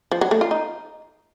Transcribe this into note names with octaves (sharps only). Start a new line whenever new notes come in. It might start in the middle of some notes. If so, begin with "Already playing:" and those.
F3
F#3
A3
F4
D#4